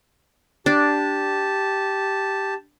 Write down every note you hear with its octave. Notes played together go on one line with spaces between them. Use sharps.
D4 G4 A5